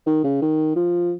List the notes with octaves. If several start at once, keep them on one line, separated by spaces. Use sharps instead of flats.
D#3
C#3
D#3
F3